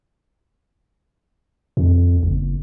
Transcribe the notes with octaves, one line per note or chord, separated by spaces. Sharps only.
F2
F#1